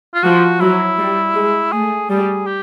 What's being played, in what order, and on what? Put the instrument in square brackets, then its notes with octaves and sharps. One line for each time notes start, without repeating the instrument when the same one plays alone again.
[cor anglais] F4
[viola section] F3 [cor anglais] F#4
[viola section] F#3 [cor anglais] E4
[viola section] G3
G#3
[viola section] A3 [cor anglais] G#4
[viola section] G3 [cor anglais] G#4
[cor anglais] G4